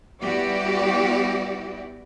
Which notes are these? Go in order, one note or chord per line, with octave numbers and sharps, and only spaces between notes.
G3 B3 E4 F#4 G4 D5